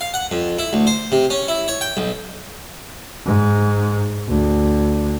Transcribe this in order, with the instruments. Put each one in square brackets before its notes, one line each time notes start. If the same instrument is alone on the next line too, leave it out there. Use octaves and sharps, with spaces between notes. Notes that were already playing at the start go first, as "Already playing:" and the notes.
[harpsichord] F5
F#5
F2
E4
D2
C5
C3
C#4
E4
C#5
G5
B1
[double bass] G#2
D2